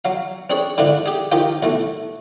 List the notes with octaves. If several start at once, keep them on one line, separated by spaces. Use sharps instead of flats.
F#3 F5
C4 D4 G#4 C#5
G#2 D3 E3 F3 D4
G4 G#4
D#3 F3 D#4 F4 G4
B1 E3 A3